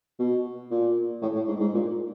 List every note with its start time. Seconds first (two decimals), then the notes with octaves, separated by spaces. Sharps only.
0.19 B2
0.71 A#2
1.22 A2
1.35 A2
1.47 G#2
1.60 G#2
1.74 A#2